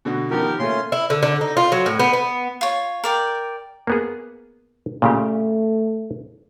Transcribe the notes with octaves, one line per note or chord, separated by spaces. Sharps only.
B2 D3 F#4
D#3 F3 B3 G4 A#4
A#2 A3 C#4 F4 C6
E4
D3
D3
D#4
F4
F#3
A2
B3
B3
F4 C#5
A#4 D5 G5
A#3 B3 G#4
A#2 C#3 A3 G4